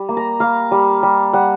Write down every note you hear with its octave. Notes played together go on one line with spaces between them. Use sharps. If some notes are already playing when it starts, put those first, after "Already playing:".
Already playing: G3
A#3
A#5
A#3 F5
G3
G3
G3 F#5